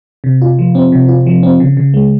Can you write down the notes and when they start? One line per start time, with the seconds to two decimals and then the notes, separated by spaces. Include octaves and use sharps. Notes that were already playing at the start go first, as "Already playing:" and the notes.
0.24 C3
0.42 F4
0.59 F3
0.75 C4
0.92 C3
1.09 F4
1.27 F3
1.43 C4
1.60 C#3
1.77 C#3
1.94 G#3